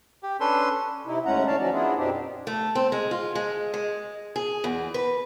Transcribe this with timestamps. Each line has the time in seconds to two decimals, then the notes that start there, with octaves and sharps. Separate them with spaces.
0.23 G4
0.40 C#4 D4 A4 B4 C6
1.06 C3 D#4 E4
1.25 D#2 G#3 A3 C#4 F#5 A#5
1.47 D3 E3 C#5 D5 F5 A5
1.60 F3 F#3 C#4 D#4 F#4 D5
1.72 B3 D4 E4 F4 G#4
1.97 F#2 B2 C4 D4 D#4 G4
2.47 A3
2.75 C4
2.92 G#3
3.11 F4
3.35 G#3
3.74 G#3
4.36 G#4
4.64 E2
4.94 B4